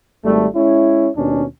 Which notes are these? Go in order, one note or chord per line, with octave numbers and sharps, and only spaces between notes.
G#1 G3 A3
G#3 C#4 E4
D#2 B2 C#4 D4